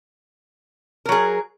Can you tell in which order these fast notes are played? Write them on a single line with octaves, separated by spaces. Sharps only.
A#4 F#3 G#4